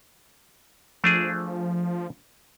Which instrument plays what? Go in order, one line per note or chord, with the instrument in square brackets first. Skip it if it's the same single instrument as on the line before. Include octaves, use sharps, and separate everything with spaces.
[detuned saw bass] F3 [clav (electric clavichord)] A3 D4 G#4